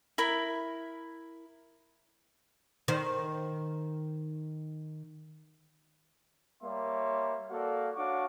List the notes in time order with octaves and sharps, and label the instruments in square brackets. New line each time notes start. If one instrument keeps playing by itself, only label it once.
[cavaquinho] E4 A#4 B5
[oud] D#3 C5
[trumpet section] G3 A#3 A#4 C#5 E5 C6
A#3 F#4 A4 D5 F5
D4 F#4 C#5 F5 C#6 D6